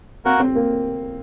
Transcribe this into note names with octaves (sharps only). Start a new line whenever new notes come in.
A#3 C4 F#4 A#4 F#5
C4
A#3